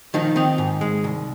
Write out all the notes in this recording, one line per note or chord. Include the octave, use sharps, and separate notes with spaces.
D#3 F3 D#4
D#3 C4 D#4
G#2
G#3
C2